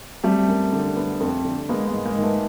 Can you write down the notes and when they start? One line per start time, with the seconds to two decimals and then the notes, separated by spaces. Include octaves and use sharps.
0.23 G3 A3 C4
0.48 F#2
0.73 D3
0.97 B3
1.20 F2
1.45 D3
1.69 G#3 A#3 B3
1.87 G#3 A#3
1.93 G#2
2.05 G#3 A#3
2.18 D#3
2.23 A3 B3